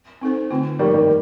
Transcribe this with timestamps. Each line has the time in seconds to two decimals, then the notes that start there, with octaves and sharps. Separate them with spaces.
0.21 C4 D#4 A4 C5
0.50 D3 A3 C4 F4
0.79 F3 G3 A3 A#3 D#4
0.93 D#3 G3